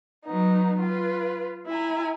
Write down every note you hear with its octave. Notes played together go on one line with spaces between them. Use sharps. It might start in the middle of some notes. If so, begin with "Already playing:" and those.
F#3 B3 D#4
F4 B4
E4 G#5 A#5